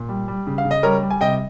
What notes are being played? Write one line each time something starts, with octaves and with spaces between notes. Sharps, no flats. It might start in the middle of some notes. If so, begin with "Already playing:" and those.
Already playing: A#2
G3
G3
C#3
F5
C#3
D#5
G3 A#4 C#5
G3
G#5
C3 D#5 G5